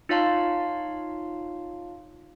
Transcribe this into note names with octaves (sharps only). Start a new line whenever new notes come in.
D#4 F4 C#5 F5 A5 C6